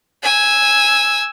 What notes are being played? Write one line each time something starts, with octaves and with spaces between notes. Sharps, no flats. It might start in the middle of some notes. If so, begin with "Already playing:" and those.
G#5 E6